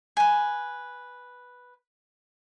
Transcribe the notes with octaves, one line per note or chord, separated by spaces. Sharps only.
B4 G#5